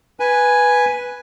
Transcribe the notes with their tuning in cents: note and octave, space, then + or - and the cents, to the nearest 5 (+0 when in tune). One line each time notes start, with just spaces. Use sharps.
B4 -5 G#5 +0